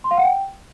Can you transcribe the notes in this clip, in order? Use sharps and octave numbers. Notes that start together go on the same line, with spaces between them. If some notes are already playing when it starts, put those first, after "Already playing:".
C6
F5
F#5
G5